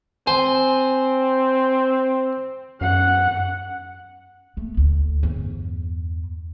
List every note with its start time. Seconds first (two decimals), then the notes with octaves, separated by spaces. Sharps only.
0.27 C4 C5 G#5
2.81 F#2 F#5
4.57 A3 B3
4.77 D2
5.23 E2 G2